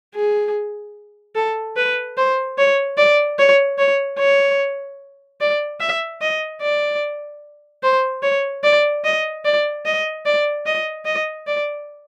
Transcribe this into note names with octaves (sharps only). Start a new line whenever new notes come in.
G#4
A4
B4
C5
C#5
D5
C#5
C#5
C#5
D5
E5
D#5
D5
C5
C#5
D5
D#5
D5
D#5
D5
D#5
D#5
D5